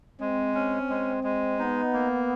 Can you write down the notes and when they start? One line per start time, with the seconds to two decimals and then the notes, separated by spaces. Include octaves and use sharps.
0.20 G#3 C4
0.55 C#4
0.90 G#3
1.24 G#3
1.58 B3 D#4
1.93 A#3